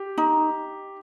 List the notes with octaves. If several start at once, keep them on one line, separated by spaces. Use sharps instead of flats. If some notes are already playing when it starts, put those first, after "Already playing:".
Already playing: G4
D#4